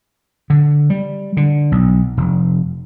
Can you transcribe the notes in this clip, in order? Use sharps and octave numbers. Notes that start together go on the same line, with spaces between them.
D3
G3
D3
B1
F1